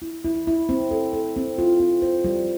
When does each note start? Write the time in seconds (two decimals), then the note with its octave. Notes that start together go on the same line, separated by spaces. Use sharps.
0.02 E4
0.24 E4
0.47 E4
0.69 C4
0.91 A4
1.13 A4
1.36 C4
1.58 F4
1.80 C4
2.02 C5
2.24 G3